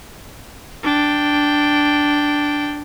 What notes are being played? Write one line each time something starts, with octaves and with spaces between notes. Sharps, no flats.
D4 G5